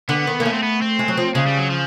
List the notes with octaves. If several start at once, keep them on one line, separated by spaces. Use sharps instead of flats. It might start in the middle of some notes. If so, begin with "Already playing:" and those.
D3 B3
D#3
A#3
A3 C#4
C4
B3
C4
G#3
F#3
F3
C#3 G#3
G3
F#3
F3